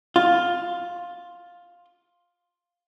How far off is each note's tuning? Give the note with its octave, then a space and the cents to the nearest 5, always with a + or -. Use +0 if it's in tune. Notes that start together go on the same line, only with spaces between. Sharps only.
F4 +10